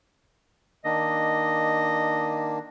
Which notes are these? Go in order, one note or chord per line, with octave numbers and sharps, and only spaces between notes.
D#3 A#3 D4 D#5